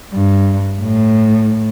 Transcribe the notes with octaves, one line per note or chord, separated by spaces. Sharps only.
G2
A2